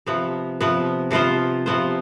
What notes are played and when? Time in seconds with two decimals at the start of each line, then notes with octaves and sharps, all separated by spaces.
0.06 C3 F3 B3
0.60 C3 F3 B3
1.11 C3 F3 B3 F4 C5
1.66 C3 F3 B3 F4 C5